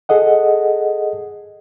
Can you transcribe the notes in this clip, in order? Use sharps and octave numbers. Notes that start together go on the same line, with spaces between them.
G#4 A4 D#5 F#5